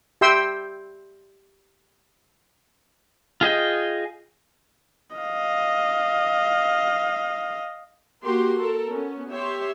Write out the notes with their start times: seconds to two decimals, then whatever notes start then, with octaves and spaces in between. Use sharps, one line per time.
0.21 G4 E5 G5 C6 E6
3.41 F4 G#4 D#5 G5
5.17 D#5 F5
8.24 A#3 F#4 G4 A#4 C6
8.59 A4 A#4
8.88 B3 C#4
9.30 G4 C#5 E5 C6